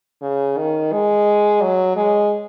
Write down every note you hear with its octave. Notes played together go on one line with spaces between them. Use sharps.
C#3
D#3
G#3
F#3
G#3